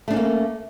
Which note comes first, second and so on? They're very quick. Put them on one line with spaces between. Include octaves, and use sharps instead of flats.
A3 D4 C#4 A#3